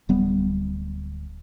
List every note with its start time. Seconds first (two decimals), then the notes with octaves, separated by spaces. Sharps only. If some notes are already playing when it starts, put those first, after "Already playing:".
0.09 D1 G3 B3